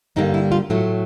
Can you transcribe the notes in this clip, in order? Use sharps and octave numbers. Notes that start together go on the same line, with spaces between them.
G2 D3 G3 A#3 D#4
E4
F4
A2 F#3 A3